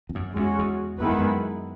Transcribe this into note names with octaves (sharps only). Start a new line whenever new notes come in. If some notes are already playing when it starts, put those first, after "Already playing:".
E2
F#2
E2 G#3 C#4 F#4
E2
F#2 D#3 G#3 B3 E4 B4
E2
F#2